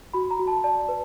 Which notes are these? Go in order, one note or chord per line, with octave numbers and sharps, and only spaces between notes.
F#4 B5
A#5
F#4
A5
D5 A5
B4